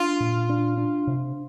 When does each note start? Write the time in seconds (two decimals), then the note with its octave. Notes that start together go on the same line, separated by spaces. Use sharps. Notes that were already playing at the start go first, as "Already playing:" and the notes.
Already playing: D4 F4
0.20 A#2
0.49 D4
0.77 D4
1.07 C3